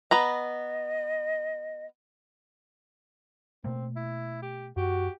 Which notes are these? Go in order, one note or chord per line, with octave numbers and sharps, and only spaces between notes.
B3 B4 D#5 A#5
B2 A3 A#3 C4
E4
G4
F#2 F#4 G4